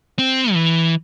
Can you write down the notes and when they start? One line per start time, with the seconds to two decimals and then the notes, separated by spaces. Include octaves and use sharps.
0.19 C4
0.52 F3
0.56 E3